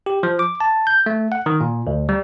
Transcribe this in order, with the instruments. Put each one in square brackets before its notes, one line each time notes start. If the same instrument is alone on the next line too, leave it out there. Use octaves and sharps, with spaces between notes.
[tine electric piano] G4
F3
D6
A5
G6
A3
F#5
D#3
A#2
D2
G3